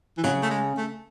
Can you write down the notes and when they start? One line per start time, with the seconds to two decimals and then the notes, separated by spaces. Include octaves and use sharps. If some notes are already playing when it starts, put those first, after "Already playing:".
0.17 E3
0.23 C#3 F#3
0.43 A3
0.51 G#3
0.77 A3